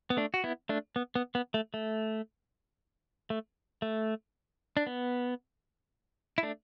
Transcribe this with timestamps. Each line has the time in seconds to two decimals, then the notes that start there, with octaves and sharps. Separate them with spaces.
0.10 B3
0.17 A3 D4
0.34 F#4
0.44 B3 E4
0.69 A3 D4
0.96 B3
1.15 B3
1.35 B3
1.54 A3
1.74 A3
3.30 A3
3.82 A3
4.77 D4
4.87 B3
6.38 E4
6.43 A3 D4